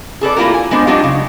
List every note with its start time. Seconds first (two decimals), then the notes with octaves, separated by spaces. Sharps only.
0.21 G#4 A4 B4 D5
0.36 A#3 E4 F4 G4 A#4
0.54 G#5
0.71 G#3 B3 D4 C5
0.87 F#3 G#3 D4 D#4 F4 G4
1.04 C#3